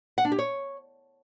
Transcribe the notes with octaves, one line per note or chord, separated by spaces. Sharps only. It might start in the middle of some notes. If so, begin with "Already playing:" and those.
F#5
D4
G4
C#5